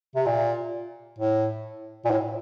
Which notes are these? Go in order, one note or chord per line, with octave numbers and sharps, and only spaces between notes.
C3
A#2
A2
A#2
A2